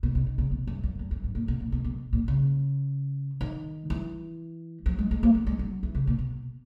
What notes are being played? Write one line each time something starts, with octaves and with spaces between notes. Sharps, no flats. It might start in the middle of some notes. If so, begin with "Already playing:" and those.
B2
B2
D#3
C#3
B2
F#2
F#2
E2
F#2
G#2
A#2
B2
A#2
B2
B2
A#2
C#3
D#3
E3
F#3
G#3
G#3
A#3
F#3
G#3
F#3
E3
C#3
A#2
B2